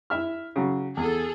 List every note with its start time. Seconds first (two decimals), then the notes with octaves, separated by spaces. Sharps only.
0.10 E4 E5 F6
0.56 C#3 F#3
0.97 E2 G#4 A4